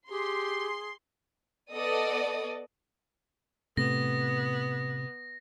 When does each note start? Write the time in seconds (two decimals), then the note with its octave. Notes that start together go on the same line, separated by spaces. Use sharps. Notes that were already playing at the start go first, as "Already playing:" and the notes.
0.10 G4 G#4 C6
1.73 B3 A4 D5 D#5 D#6
3.77 A2 C3 A3 B3 A#6